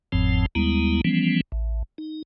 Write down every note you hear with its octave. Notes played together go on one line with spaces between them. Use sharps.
F#1 E2 G#2 F3 C4 A5
D#2 G3 G#3 B3 E4 A#5
E3 F3 G3 B3 C#4
A1
D#4